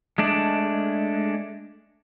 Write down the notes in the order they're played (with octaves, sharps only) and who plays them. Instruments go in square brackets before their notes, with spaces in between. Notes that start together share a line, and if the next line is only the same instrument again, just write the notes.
[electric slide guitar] G#3 A3 D4